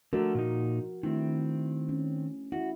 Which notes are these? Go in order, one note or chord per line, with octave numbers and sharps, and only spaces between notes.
D3 F3 A3 D4 F#4 A#4
A#2 D#4
D#3 A3 C4 D4 E4
C#4
E4 F#4